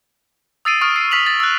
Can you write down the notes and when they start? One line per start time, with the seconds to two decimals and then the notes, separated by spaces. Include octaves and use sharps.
0.65 D#6 E6 A6 C7 D7 D#7
0.81 C#6 D#6 F6 D7
0.96 C7
1.11 C#6 F6 B6 D#7 F7 F#7
1.26 A6
1.40 E6 F#6